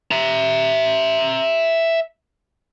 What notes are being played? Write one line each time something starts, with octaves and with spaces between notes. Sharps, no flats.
E5 A#5